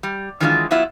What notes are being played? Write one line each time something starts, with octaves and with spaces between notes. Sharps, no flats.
G3
D#3 E3 F#3 G#3 D4 F4
F#3 B3 E4 F4 E5